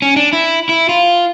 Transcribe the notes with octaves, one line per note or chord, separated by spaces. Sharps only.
C#4
D4
E4
E4
F4